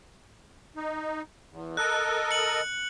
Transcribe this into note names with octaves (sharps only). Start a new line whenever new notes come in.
D#4
E2
A4 A#4 D#5 F#6
C#7 F#7